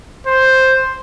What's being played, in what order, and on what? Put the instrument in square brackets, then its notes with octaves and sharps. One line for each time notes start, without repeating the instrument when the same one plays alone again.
[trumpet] C5